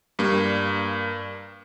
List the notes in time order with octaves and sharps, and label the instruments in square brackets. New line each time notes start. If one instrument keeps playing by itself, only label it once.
[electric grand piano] G2 A#3